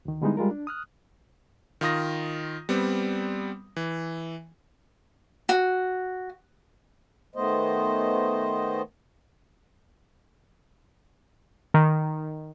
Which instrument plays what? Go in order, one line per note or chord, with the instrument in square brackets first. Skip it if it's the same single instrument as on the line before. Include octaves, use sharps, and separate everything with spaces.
[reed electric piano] D2 D#3
D3 G3 G#3 B3 D#4 E4
G3 G#3 F4 A#4
D4
D#6 F6 F#6
[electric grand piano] D#3 F4 D#6 A#6
G3 B3 C4
E3
[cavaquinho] F#4
[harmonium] D#3 A3 B3 C5 D#5
[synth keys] D#3